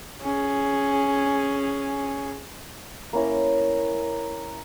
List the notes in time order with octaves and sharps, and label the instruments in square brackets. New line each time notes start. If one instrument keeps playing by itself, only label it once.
[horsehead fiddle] C#4 G#4
[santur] A#3 C#4 E4 A#4